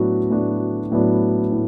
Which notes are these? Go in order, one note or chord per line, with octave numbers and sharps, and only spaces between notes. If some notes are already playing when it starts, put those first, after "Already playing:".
Already playing: A2 F#3 B3 D4 F#4
A2 F#3 B3 D4 F#4
A2 F#3 B3 D4 F#4
A2